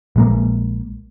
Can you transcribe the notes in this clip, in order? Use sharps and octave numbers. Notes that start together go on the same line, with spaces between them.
A#1 G#3 A#3